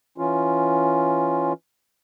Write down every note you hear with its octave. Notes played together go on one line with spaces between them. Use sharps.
E3 C#4 F4